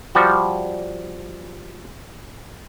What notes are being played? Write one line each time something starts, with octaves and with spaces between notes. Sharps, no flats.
F3 G3 F#4